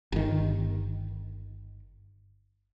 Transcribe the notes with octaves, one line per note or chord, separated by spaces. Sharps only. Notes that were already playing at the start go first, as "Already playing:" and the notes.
G1 D#3